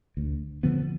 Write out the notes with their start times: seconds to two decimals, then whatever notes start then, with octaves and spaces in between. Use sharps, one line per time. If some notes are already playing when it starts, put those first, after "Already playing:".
0.17 D2
0.63 D3 F3 B3